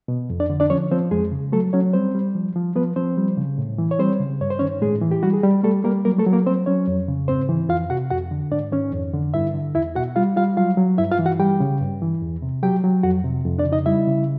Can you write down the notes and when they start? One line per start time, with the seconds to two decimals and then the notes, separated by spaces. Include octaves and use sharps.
0.08 B2
0.30 F2
0.40 D4 D5
0.50 D3
0.60 D4 D5
0.70 F3 C#4 C#5
0.91 F3 C4 C5
1.11 F2 G#3 G#4
1.32 C#3
1.52 F#3 A3 A4
1.73 F#3 C#4 C#5
1.93 G3 C4 C5
2.15 G3
2.35 F3
2.56 F3
2.76 F3 B3 B4
2.96 F3 C4 C5
3.17 G3
3.37 C#3
3.58 A2
3.78 E3
3.91 C#5
3.99 G3 C4 C5
4.20 C#3
4.41 G2 C#5
4.50 C5
4.59 D#3 C#4 C#5
4.81 A2 G#3 G#4
5.02 E3
5.11 G4
5.23 G3 F#4
5.33 G#4
5.43 G3 G4
5.63 G3 A3 A4
5.84 G3 A#3 A#4
6.05 F#3 A#3 A#4
6.18 A3 A4
6.26 F#3
6.33 A#3 A#4
6.46 F#3 C4 C5
6.66 F#3 C#4 C#5
6.88 F2
7.08 C#3
7.28 G#2 C4 C5
7.49 E3
7.69 F2 F4 F5
7.90 C3 F#4 F#5
8.11 F2 F#4 F#5
8.31 D3
8.52 G#2 D4 D5
8.72 D#3 C#4 C#5
8.93 F2
9.13 D3
9.34 G2 E4 E5
9.54 D3
9.74 E2 E4 E5
9.95 B2 F#4 F#5
10.16 G3 F4 F5
10.36 G3 F4 F5
10.57 F#3 F4 F5
10.77 F#3
10.98 G2 E4 E5
11.12 F4 F5
11.19 E3
11.26 F#4 F#5
11.39 G3 G4 G5
11.60 C#3
11.80 G2
12.02 E3
12.22 E2
12.42 C3
12.63 F#3 G4 G5
12.84 F#3
13.03 F2 F#4 F#5
13.24 C3
13.45 F2
13.59 D4 D5
13.65 C#3
13.72 D#4 D#5
13.86 G3 E4 E5
14.07 C#3